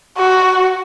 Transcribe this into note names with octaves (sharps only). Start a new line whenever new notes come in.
F#4